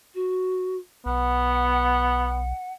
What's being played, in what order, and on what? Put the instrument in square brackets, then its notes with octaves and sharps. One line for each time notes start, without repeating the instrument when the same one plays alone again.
[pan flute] F#4
[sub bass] B1 [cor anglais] B3 [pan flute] F#5